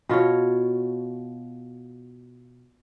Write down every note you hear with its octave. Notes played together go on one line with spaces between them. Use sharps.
B2 F4 F#4 C#5